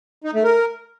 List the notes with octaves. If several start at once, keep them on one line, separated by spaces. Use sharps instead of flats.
D#4
A3
A#4